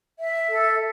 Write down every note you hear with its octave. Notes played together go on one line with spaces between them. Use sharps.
E5
A4